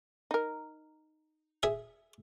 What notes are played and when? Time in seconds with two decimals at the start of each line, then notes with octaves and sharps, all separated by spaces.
0.31 D#4 A#4
1.63 G#4 E5